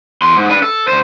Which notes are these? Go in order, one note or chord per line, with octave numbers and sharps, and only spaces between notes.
E2 C6
G#2
D4 B4
A4
D2 C5